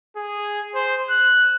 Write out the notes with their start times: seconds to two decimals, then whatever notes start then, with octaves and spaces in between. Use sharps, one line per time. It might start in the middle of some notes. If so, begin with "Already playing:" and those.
0.17 G#4
0.75 C5
1.10 F#6